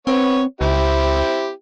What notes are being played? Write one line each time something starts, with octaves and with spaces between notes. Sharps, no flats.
B3 C4 C#5
C#2 C4 E4 G4